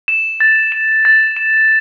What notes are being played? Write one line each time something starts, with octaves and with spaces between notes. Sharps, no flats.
E7
A6
E7
A6
E7